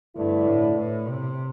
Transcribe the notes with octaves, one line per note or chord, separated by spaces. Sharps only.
G2 D3 A3 E4 B4 D5
A2
A2
C3